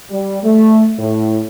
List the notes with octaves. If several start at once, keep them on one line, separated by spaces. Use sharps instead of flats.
G3
A3
A2